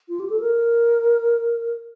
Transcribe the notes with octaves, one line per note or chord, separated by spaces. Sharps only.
F4
G4
A4
A#4